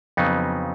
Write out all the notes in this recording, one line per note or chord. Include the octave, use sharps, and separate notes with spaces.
F2 C#3 F#3 B3 D#4